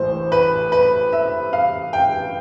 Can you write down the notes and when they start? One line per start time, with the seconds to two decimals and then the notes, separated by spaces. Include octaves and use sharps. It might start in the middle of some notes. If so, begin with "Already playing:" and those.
Already playing: A1 A2 E3 C5
0.32 B4
0.72 B4
1.13 E5
1.53 F5
1.93 G5